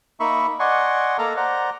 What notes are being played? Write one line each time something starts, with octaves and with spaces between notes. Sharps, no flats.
A#3 D#4 E5 B5 C#6
D5 D#5 F#5 G#5 C6 C#6
A#3 A4 F5 A#5
C5 D5 F#5 A#5